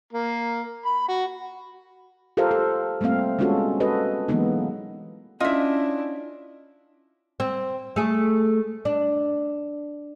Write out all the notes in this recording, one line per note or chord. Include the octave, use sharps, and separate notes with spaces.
A#3
B5
F#4
F4 G4 A4 A#4 C5 F5
A4
G3 A3 A#3 C4 F5
G#3 B3 C#4 F4 F#4 A4
F#4 A4 B4 D#5
E3 F#3 G#3 A#3 B3 D#4
C#4 D4 E4 F4 D#5 E5
C4
A3 G#4
D4